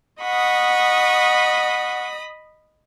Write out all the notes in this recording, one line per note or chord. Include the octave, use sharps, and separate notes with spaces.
D#5 F#5 B5 C#6 D#6